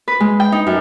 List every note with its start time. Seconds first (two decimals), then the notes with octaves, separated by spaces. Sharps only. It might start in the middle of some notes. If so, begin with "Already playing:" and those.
0.08 B4
0.20 G#3
0.40 G5
0.52 D#4
0.67 F#2